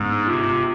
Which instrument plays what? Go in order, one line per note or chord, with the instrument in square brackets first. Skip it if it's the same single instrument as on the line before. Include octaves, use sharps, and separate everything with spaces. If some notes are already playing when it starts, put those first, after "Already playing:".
Already playing: [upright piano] G1 G#3 C#4 [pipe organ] G#2
[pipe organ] C3 [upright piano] F4